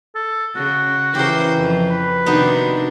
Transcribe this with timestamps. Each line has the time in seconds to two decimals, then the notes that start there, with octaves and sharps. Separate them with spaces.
0.15 A4
0.56 C#3 F#4
1.15 C#3 E3 G4 A#4 C5
1.57 F2
1.90 B4
2.26 C3 D#3 B3 D4 D#4 F#4 C5